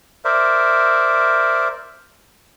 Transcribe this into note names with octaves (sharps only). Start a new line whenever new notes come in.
A#4 C5 D5 E5